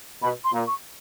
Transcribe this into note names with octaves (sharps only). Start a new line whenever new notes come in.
B2 B5
C6
A#2
C#6